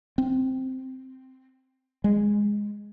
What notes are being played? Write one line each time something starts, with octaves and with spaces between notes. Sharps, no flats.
C4
G#3